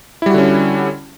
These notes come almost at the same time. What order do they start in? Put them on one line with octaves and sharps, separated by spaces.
E4 G3 F#4 D3 C#4